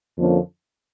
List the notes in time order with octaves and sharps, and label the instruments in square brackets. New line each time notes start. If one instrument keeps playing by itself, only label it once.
[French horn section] F2 D3 F3 A#3 C#4